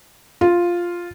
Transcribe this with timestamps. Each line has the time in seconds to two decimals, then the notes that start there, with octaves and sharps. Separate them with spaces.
0.41 F4